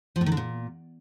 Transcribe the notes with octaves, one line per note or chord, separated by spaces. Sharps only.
F3
A2
D#3
D3
A#2